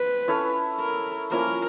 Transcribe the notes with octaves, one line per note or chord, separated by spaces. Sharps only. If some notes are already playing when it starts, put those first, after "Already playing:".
Already playing: C4 B4
C#4 E4 A4 C#5
A#4
F3 A#3 C#4 E4 A#4